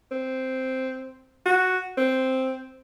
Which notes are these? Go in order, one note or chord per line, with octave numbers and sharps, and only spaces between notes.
C4
F#4
C4